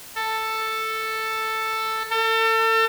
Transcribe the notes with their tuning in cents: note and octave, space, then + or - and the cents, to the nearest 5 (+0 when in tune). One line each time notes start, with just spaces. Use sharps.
A4 +5
A4 +35